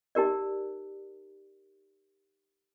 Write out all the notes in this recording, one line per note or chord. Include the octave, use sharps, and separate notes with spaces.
D#4 G4 A#4 D5